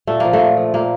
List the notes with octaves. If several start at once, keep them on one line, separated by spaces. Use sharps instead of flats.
A#2 A3
F3 A#3
A3
A#2
F3
A#2 A#3